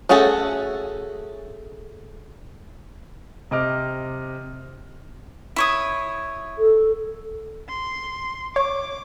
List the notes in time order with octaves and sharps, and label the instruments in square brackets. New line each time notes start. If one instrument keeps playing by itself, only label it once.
[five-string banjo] A3 C#4 F#4 G#4 A4
[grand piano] C3 D#5 D6 F6
[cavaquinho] E4 C#5 D#6
[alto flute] A4
[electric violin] C6
[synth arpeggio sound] C#5 [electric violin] D6